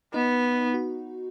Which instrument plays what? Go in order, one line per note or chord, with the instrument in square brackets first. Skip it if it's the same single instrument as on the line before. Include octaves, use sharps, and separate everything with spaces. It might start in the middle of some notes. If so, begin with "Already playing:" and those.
[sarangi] B3 [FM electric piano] D#4
[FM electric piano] F#4